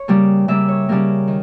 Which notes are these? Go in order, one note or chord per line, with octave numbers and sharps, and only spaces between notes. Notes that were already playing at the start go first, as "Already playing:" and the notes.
Already playing: C#5
C#3 G3 A#3
C#3 G3 A#3 E5
C#5
C#3 G3 A#3 A#4
D#3